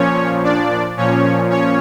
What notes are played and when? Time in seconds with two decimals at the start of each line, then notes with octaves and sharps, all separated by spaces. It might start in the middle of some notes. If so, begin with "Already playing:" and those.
Already playing: A#2 F3 C#4 C#5
0.43 D4 D5
0.97 A#2 F3 C#4 C#5
1.50 C#4 C#5